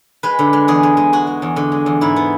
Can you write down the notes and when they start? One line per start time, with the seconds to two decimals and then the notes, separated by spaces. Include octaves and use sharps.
0.23 G#3 B4
0.39 D3
0.53 G#3
0.68 E2 G#4
0.83 G#3
0.97 G#3
1.13 G#3 F#4
1.27 G#3
1.42 E2
1.56 D3
1.72 G#3
1.86 E2
2.01 G#2 E4
2.16 B3